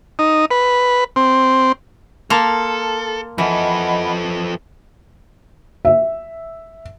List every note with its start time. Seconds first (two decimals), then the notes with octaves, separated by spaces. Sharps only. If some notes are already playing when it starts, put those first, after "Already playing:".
0.19 D#4
0.51 B4
1.16 C4
2.30 A#3 A4 A5 C6 F6
3.38 E3 F3 A4 D#5 F#5 B5
5.85 E5